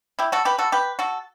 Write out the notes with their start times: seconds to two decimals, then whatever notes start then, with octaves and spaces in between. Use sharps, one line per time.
0.19 E4 G4
0.32 F#4 A4
0.45 G4 B4
0.58 F#4 A4
0.72 G4 B4
0.99 F#4 A4